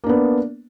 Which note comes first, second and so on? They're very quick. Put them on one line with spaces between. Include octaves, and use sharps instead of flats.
A#3 D4 B3